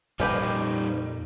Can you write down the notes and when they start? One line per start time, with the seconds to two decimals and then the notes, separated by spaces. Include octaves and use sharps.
0.20 F2 A#2 F3 G3 D#4 G4 B4